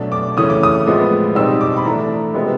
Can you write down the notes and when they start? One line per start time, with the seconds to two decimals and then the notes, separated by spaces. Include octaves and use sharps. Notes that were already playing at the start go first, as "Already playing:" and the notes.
Already playing: B2 F#3 A3 D4
0.12 D6
0.37 C#3 E3 A3 C#4 D#6
0.50 D6
0.63 D#6
0.86 A2 F3 G#3 B3
1.35 B2 G3 C4 D#4 E6
1.61 D6
1.77 B5
1.85 E3 A3 D4 A#5
2.34 C3 F3 G#3 B3